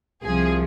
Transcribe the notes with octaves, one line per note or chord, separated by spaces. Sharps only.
C2 C3 F3 G#4